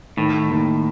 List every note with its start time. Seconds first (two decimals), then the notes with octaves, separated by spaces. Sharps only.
0.17 A2 D#3
0.50 D#2